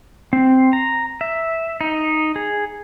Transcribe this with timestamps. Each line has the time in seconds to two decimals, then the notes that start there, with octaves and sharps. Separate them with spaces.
0.33 C4
0.73 A#5
1.21 E5
1.81 D#4
2.36 G#4